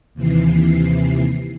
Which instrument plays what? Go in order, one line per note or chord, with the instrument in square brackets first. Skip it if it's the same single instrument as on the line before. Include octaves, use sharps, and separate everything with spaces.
[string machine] D#2 C3 E3 C7